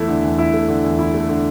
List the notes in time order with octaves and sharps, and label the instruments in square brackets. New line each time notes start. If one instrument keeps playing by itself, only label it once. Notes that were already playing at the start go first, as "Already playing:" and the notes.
Already playing: [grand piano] E2 A3 E4
D3
E2
E4
A3
D3
E2
E4
A3
D3